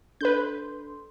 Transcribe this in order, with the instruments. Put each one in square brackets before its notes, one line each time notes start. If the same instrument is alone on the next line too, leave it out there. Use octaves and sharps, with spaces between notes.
[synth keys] D4 A4 C6 [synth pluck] B4 G6